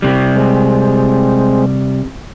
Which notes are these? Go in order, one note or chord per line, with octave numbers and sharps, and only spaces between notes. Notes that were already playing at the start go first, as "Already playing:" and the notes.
C3 G3
G#3 C4